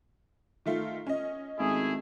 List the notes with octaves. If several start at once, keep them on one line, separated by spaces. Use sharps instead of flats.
D#3 A3 F4
C#4 D#5
G#1 A3 E4 G#4